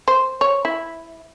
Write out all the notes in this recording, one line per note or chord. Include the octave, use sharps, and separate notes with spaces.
C5
C#5
E4